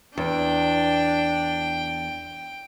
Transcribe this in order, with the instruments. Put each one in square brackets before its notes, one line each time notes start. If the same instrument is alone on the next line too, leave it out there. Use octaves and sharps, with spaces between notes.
[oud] E2 [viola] D4 [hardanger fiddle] G5